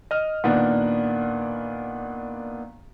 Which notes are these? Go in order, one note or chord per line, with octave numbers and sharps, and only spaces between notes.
D#5 F6
A#2 D#3 B3 D4